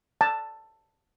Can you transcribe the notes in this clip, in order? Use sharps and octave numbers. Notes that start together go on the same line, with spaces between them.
A5